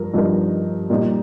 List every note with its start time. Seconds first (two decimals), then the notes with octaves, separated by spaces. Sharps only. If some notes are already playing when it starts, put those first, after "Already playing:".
Already playing: G2 F3 A#4
0.14 G2 F3 D#4 A#4
0.90 A#2 G3 D#4